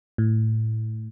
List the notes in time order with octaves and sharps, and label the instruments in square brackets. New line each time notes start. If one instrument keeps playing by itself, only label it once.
[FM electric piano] A2